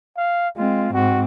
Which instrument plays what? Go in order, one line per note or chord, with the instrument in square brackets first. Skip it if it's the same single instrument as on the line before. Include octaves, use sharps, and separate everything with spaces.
[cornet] F5
[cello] G#3 C4 [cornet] F4
[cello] G#2 C4 [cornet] F#4